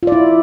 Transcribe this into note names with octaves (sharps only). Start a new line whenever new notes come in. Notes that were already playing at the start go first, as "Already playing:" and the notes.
E4 F4 D5